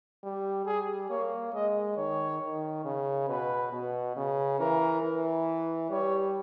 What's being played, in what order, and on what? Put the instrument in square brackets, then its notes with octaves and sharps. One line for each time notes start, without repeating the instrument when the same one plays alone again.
[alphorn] G3
[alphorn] G3 [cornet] G#4
[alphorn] A#3 [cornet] C#5
[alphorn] G#3 [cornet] D#5
[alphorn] D#3 [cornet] C#5
[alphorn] D#3
C#3
[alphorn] B2 [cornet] B4
[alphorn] B2
C#3
[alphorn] E3 [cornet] A#4
[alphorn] E3
[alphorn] G3 [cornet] C#5